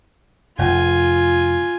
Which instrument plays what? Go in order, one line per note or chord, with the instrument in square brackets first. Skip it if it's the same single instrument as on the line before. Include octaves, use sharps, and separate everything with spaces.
[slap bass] F1 [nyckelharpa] F4 G#5